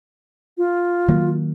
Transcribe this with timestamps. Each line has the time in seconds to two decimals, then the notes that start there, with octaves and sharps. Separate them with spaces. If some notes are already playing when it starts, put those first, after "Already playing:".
0.58 F4
1.08 D#3 F#3 A#3